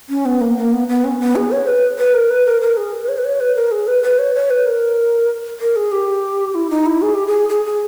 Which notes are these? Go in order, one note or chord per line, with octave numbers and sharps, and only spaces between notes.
C#4
B3
A#3
A#3
B3
B3
C#4
B3
G#4
C#5
B4
B4
A#4
B4
A#4
A#4
G#4
B4
C#5
B4
C#5
B4
A#4
G#4
B4
B4
C#5
C#5
B4
A#4
A#4
G#4
G4
E4
D#4
E4
G#4
G4
G#4
G#4
G#4